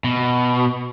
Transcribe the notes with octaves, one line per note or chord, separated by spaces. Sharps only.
B2